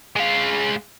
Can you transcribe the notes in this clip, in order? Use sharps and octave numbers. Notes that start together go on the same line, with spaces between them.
G#3 F5